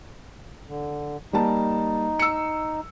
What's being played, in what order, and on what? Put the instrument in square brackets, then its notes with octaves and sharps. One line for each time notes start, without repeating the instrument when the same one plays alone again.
[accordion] D3
[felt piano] G3 A#3 A5 [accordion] D#4
[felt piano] E6 C#7